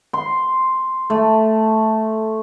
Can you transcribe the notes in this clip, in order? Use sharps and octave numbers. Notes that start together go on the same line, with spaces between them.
C6
A3